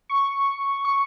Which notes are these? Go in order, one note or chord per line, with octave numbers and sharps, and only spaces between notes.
C#6
C#6